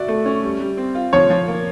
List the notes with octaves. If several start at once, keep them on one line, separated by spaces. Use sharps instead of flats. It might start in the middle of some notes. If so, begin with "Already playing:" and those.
Already playing: F#4 D5 E5
A3
C#4
G3
G3
C4
F4
F3 C#5
F3
A#3